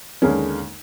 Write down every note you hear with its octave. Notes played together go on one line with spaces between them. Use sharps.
D#2 D3 G#3 A#3 C#4